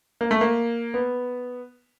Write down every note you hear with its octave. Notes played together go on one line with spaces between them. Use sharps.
A#3
A3
A#3
B3